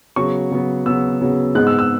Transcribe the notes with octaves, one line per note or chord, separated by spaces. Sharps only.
C#3 F#3 B3 C#6
C#3 F#3 B3
C#3 F#3 B3 E6
C#3 F#3 B3
G#2 G#3 B3 F#6
E6
E6